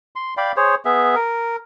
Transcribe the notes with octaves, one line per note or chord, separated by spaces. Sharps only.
C6
D5 F5 G5 B5
G#4 C5 C#5
B3 G#4 E5
A#4